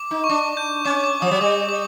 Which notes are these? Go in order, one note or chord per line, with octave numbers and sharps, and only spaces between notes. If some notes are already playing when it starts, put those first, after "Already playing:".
Already playing: D6
D#4
C#6
D4 D6
G6
C#4 D6
D6
F3 D#6
F#3
G3 D6
D6